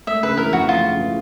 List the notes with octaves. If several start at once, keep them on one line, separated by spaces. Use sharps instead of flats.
A3 E5
C#3 B4
E3 A#4
F2 F#4
A3 F4
C#3
E3